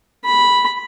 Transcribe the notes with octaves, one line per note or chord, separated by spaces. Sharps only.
B5